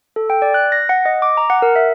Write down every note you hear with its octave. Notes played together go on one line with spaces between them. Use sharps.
A4
G5
D5
F#6
A#6
F#5
D#5
D6
A#5
F#5
A#4
E5